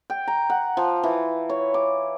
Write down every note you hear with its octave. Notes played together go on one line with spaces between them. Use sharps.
G5
A#5
F#5
F3
E3
C#5
D6